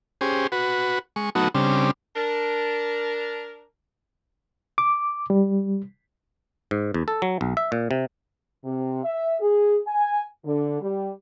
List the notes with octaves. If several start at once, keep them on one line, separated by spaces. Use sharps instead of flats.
C#4 G4 G#4 C5
F#4 B4
G#3 C#6
F#3 A3 B3 D#4 F#4
C#3 G3 C4 D4
D4 A#4
D6
G3
G#2
E2
A4
F#3
B1
E5
A#2
C3
C3
E5
G#4
G#5
D3
G3